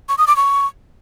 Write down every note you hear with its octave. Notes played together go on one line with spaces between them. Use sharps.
C#6
D#6
D6
C#6